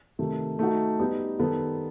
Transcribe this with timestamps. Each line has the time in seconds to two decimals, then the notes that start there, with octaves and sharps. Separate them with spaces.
0.19 C3 D#3 A3
0.59 A3 D#4 F#4
0.99 G3 B3 D#4 G4 B4
1.40 D#3 G3 B3 D#4 A4